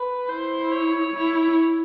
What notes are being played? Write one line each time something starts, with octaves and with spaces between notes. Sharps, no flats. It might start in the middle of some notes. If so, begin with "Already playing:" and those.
Already playing: B4
E4 C5
C#5
E4